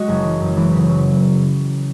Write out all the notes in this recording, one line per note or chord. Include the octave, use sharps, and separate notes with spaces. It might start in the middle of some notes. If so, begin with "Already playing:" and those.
Already playing: G#3 F#4
F#1 G#4
E3
F#2
E3
C#3
F#3